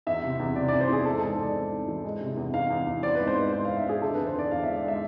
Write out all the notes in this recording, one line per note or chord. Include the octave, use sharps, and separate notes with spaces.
E2 E5
C3
E2
C3 D5
E2 D5
C5
E2 G#4
G#3 A4
G#2 A4
C5
G#2 D5
C4
G#2
E3
G#3
C3
E2
E2 F5
E2
E2
C4 D5
G#2 B4
C5
G#2 B4
G#2 C5
G#2 F5
E5
C4 G#4
D3 A4
E2 B4
C5
E2 D5
E2 F5
G#3 E5
D5
G#3 E5